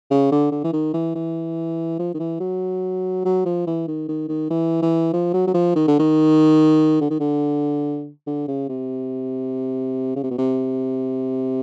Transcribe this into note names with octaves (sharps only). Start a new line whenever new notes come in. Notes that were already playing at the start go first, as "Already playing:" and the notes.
C#3
D3
D3
E3
D#3
E3
E3
F3
D#3
E3
F#3
F#3
F3
E3
D#3
D#3
D#3
E3
E3
F3
F#3
F#3
F3
D#3
D3
D#3
D3
D#3
D3
D3
C#3
C3
C#3
C3
B2
C3